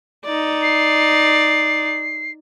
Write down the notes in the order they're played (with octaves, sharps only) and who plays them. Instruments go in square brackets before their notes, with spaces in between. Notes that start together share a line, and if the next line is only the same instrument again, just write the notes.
[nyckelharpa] D#4 D5
[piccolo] C7